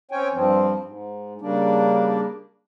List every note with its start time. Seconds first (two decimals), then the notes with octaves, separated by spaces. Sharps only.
0.11 C4 C#4 C#5 G5 G#5
0.33 G2 F3 C4
0.85 G#2
1.41 C#3 G3 A#3 D4